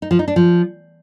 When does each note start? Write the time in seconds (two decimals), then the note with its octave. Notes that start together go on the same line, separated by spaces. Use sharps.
0.02 D#4
0.11 F3
0.19 D#4
0.28 D4
0.36 F3